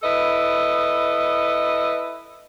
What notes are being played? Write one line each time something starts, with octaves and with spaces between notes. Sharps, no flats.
E4 A4 B4 D#5